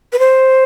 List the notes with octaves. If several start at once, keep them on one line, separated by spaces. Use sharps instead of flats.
B4
C5